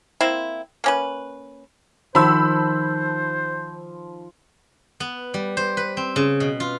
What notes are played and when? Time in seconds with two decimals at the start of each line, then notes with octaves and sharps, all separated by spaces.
0.21 A#3 C4 E4
0.84 A#3 C#4 B4
2.15 D#3 F3 C5 B5 E6
5.00 B3
5.34 G3
5.57 C5
5.77 B4
5.97 C4
6.16 C#3
6.40 B2
6.60 F4